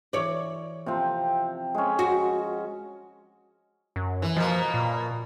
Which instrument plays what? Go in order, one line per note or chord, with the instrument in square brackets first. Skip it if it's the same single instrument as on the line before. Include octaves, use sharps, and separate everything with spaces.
[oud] E3 C#5 D5
[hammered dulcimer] C3 F3 C4
G#3 C#4
[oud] F#4
[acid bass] F#2
[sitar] E3
[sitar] B2 A#3 [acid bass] F3
[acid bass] A#2